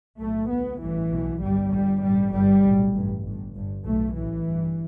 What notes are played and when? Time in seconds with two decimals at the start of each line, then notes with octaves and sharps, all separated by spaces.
0.18 B1 A2 A3
0.49 D2 B3
0.80 A1 G2 E3
1.10 B1 B2
1.41 G1 G2 G3
1.72 G1 G2 G3
2.02 A1 G2 G3
2.33 G1 G2 G3
2.63 B1 A2
2.94 A1 G2
3.25 G1 G2
3.55 G1 G2
3.85 B1 A2 A3
4.16 A1 A2 E3
4.47 G1 G2